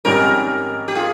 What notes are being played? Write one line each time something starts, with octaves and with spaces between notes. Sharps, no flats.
G#1 G#2 D#3 G3 C#4 G4 A#4
G4
F4 G#4